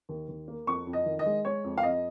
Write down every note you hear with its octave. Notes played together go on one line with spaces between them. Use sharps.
D#2
D#2
A#3
F2 C#6
F2
D#5
D#3
D#5
G#3
G#3 C#5
F2
F5
F2 D#5